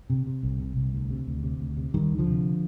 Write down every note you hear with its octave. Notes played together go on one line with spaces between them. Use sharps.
C3
C3
C2
C3
C2
D2
C3
D2
C3
D2
C3
D2 D#3 G3
D2
D3 F3
C3